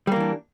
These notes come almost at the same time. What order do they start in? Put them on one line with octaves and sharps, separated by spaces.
G3 A#3 E3 D4